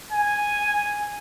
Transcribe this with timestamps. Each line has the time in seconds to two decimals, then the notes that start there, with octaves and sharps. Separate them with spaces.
0.12 G#5